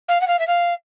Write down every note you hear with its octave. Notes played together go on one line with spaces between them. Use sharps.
F5
F#5
F5
E5
F5